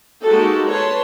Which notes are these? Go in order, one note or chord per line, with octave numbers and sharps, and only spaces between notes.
G#3 A#3 D#4 F#4 G4 A4
B4 C#5 A5 C6